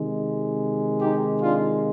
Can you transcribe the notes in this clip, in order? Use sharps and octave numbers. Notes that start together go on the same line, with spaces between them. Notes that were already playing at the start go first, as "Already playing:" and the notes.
Already playing: C3 D#3 G#3
D#4 G4
D4 F4